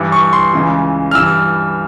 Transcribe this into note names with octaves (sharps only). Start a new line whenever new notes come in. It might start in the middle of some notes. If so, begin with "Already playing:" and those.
Already playing: G2 E3
C#6
C6
C#2 C#3 E3
F6
G2 E3 E6